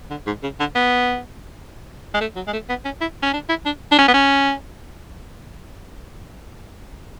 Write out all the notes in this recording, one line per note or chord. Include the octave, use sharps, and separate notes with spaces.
D3
G#2
C#3
D3
B3
G#3
A3
F#3
G#3
A3
B3
C#4
E4
C#4
D4
E4
D4
D4
C#4
B3
C#4